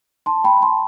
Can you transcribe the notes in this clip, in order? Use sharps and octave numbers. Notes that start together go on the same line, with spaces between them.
A5 C6
G5 B5
A5 C6